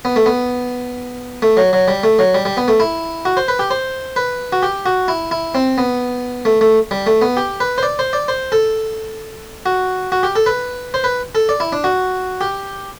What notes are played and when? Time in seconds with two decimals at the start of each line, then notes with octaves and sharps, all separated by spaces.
0.05 B3
0.16 A3
0.26 B3
1.42 A3
1.57 F#3
1.73 F#3
1.88 G3
2.03 A3
2.19 F#3
2.34 G3
2.45 G3
2.57 B3
2.68 A3
2.80 E4
3.25 F#4
3.37 C5
3.48 B4
3.59 G4
3.71 C5
4.16 B4
4.52 F#4
4.63 G4
4.86 F#4
5.08 E4
5.31 E4
5.55 C4
5.78 B3
6.45 A3
6.61 A3
6.91 G3
7.06 A3
7.21 B3
7.37 G4
7.60 B4
7.78 C5
7.83 D5
7.99 C5
8.13 D5
8.28 C5
8.52 A4
9.66 F#4
10.12 F#4
10.23 G4
10.36 A4
10.46 B4
10.94 C5
11.04 B4
11.35 A4
11.49 D5
11.60 E4
11.73 D4
11.84 F#4
12.41 G4